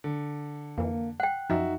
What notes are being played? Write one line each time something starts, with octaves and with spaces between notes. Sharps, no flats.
D3
F2 E3 A#3
F#5 G5 F#6
F#2 F3 D#4 F#4 E5